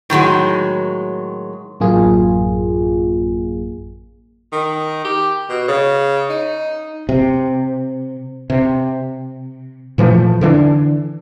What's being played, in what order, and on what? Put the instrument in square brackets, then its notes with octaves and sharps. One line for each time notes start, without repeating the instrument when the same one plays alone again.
[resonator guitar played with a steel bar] A2 D#3 F#3 G#3
[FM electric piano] A1 F#2 A#3 F4 G#4
[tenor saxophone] D#3
G4
B2
C#3
D#4
[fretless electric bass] C3
C3
A#2 E3 F3 A3
D3 E3 A3 D4